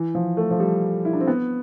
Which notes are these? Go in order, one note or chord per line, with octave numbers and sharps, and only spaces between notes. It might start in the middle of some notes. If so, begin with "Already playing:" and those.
Already playing: E3
F3
A3
F3
G3
E4
D4
C4
B3